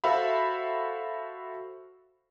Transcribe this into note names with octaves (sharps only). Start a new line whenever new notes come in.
F#4 A4 C5 E5 F5 B5